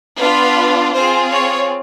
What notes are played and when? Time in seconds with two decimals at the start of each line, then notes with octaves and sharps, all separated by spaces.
0.19 B3 D4 F4 B4
0.94 C4 F4 G#4 C5
1.32 C#5